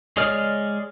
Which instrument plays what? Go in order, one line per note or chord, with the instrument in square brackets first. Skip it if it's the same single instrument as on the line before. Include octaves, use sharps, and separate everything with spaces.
[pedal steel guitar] G#3 G#4 C#5 D5 F6